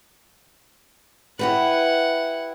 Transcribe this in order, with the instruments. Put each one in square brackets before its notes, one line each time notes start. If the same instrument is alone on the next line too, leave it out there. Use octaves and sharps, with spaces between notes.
[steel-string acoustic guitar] E4 G4 B4 [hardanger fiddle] F#5